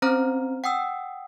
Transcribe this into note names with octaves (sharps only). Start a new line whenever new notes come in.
C4 C#4 C5 A#5 F6
F#5 G5 D#6 E6